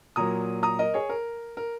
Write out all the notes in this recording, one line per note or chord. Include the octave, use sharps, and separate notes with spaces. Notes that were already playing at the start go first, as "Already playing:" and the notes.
A#2 F#3 A#3 A#5 D#6
A#5 D#6
A#4 D#5
G#4 C#5
A#4
A#4